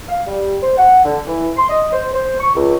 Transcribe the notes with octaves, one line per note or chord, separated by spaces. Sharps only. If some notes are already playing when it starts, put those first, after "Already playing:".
F5
G3
C5
F#5
D3
E3
C6
D#5
C5
C5
C#6
C#2